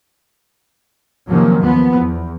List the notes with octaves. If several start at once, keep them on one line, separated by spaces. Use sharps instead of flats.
C3 D#3 F3 F#3 A#3 C#4
D#2 F3 B3
E2